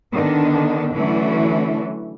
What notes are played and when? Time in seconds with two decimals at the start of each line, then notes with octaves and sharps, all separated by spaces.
0.13 D3 D#3 B3 D4
0.96 D3 E3 F#3 A3 C#4 D4